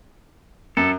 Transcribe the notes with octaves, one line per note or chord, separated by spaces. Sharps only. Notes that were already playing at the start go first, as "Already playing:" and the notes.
F#2 A4